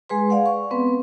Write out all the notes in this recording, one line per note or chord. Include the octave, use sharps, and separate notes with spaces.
G#3 G#4 B4 C6
D5 F5 F#5
C#6
B3 C4 B4